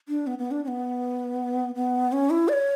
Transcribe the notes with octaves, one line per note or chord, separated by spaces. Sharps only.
D4
B3
B3
D4
C#4
B3
B3
C#4
E4
D5
C#5